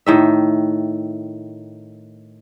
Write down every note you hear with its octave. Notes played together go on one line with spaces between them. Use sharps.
A2 D#3 E5